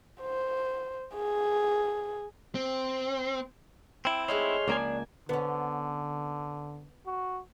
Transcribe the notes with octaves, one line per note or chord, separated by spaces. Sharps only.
C5
G#4
C4
C4 E4 G5
G#3 A3 D#4 C#5 C6 F6
C#2 F3 A#3 D4 G#5
D3 B3 C#4
F#4